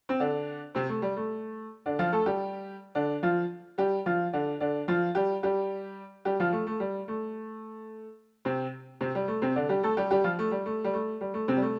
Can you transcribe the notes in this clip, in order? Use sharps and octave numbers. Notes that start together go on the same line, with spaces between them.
C4
D3 D4
C3 C4
A3
G3
A3
D3 D4
F3 F4
A3 A4
G3 G4
D3 D4
F3 F4
G3 G4
F3 F4
D3 D4
D3 D4
F3 F4
G3 G4
G3 G4
G3 G4
F3 F4
A3
A3
G3
A3
C3 C4
C3 C4
G3
A3
C3 C4
D3 D4
G3 G4
A3 A4
G3 G4
G3 G4
F3 F4
A3
G3
A3
G3
A3
G3
A3
C3 C4
G3
A3